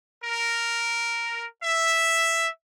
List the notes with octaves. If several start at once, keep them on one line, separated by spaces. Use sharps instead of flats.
A#4
E5